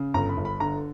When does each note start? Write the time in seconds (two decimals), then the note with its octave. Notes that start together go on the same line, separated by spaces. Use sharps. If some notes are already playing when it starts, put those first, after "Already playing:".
Already playing: C#3
0.14 G1 A#5
0.29 B5
0.37 G1
0.45 B5
0.60 D3 A#5